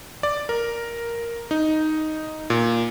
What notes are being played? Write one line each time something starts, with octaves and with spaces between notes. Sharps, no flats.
D5
A#4
D#4
A#2